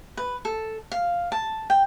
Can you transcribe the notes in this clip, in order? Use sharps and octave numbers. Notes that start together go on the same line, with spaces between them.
B4
A4
F5
A5
G5